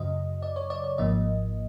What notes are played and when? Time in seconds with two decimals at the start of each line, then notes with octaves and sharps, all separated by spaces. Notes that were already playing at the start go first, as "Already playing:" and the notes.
Already playing: F#2 C#3 F#3 D#5
0.42 D5
0.56 C#5
0.70 D5
0.84 D5
0.98 G#1 G#2 F3 A#3 D#5